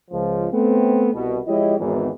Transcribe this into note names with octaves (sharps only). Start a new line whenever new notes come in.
C#2 F3
A3 B3 C4
C2 B2
F3 G#3 E4 G4 C#5 D#5
G#1 E2 G#2